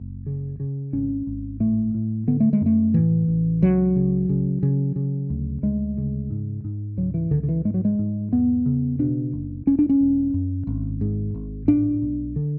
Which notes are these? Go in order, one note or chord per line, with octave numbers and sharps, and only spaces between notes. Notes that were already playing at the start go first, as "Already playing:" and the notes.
Already playing: F#1
C#3
C#3
G#1 C#4
G#1
A2 A3
A2
D3 B3
A3
G#3
F#2 A3
A2 E3
A1
C#2 F#3
C#3
C#3
C#3
C#3
D2
D2 G#3
C#3
G#2
G#2
C#2 F#3
E3
C#2 D3
D3
E3
G#2 G#3
F#3
G#3
G#2
E2 B3
C#3
B2 D4
F#1
E1 C#4
D4
C#4
E1
F#2
G#1
G#2
G#1
A2 D4
B1
D3